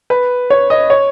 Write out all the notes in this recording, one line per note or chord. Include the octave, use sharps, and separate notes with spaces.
B4
C#5
D#5
C#5